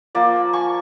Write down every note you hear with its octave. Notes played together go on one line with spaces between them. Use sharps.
F3 A#3 D5
G#5 C#6